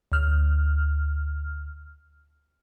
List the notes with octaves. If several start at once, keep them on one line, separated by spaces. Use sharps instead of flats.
D2 F6